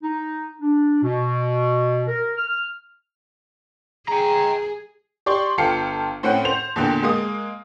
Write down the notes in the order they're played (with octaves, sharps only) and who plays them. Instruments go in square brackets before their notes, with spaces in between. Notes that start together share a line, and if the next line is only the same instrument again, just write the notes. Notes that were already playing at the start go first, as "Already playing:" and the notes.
[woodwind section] D#4
D4
B2
A#4
F6
[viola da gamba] G#4 [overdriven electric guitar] G5 A#5
[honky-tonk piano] G4 D5 C6 C#6
G1 F4 A4 G5 C7 C#7
A2 C4 C#4 F#5 G5
C5 G6 F7
E2 A#2 D3 G5
G#3 A#3 D#6